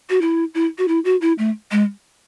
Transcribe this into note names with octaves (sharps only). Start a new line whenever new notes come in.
F#4
E4
E4
F#4
E4
F#4
E4
A3
G#3